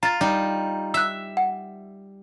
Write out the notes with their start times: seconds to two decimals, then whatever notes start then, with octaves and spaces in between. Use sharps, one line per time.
0.03 F4 A#5 A6
0.21 G3 D#4
0.94 E5 E6 F#6
1.37 F#5